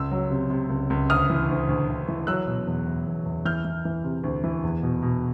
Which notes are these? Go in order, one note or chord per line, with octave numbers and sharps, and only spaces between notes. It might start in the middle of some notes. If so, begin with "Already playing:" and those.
Already playing: C#2 E6
F#3
C3
C3
C#2
C#2
D2 D#6 F6
E3
D2
D2
D2
E3
F#3 E6 F#6
B2
E2
E2
E2
E2
E3 F6 G6
E3
E3
C3
D2
E3
E2
B2
B2